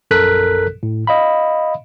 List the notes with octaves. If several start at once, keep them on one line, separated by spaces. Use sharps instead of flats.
A#1 F#2 A4 A#4 F#6 B6
A2
D#5 F5 B5